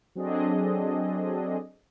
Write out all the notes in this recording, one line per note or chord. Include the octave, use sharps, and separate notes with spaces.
F#3 C4 D4 G#4 A4 D#5